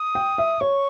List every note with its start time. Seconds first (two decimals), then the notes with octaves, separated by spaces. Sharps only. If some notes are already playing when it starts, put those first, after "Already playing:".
Already playing: D#6
0.15 G5
0.38 E5
0.61 C#5 C#6